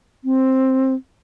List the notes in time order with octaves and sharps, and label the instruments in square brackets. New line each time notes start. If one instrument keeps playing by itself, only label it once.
[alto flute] C4